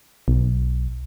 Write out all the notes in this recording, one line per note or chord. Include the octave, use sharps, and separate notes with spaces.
B1